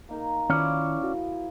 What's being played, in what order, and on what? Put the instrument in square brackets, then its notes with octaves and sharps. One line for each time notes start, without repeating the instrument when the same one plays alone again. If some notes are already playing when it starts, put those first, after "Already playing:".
[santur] A#3 D#4 A#4
[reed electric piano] D#3 [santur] F3 E4 E6 [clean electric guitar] C#4 D5
[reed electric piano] F#4